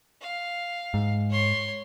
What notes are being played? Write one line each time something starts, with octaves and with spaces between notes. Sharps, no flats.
F5
G#2
C#5 C6